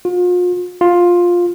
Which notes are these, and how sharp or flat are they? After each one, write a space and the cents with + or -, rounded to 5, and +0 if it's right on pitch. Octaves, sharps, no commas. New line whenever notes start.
F4 +40
F4 +10